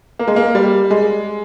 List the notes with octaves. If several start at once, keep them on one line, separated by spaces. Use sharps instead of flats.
A#3
G#3
A#3
G3
G#3